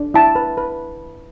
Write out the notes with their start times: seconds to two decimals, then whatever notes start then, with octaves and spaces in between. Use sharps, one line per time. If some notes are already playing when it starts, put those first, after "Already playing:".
Already playing: D4
0.14 E4 A5
0.35 B4
0.57 B4